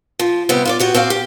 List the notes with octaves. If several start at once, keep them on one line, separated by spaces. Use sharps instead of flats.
F3
C3 G3 B3
F4 B4 D5
B3 F#4 G4
C4 F#4 D5 F5
G4